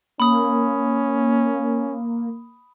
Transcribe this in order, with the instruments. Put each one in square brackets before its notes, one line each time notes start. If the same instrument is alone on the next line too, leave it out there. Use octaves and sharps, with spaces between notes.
[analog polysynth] A#3 [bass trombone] C#4 [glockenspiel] B5 D#6